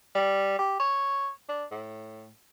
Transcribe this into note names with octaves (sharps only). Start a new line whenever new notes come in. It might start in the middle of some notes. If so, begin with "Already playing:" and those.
G3
G4
C#5
D4
A2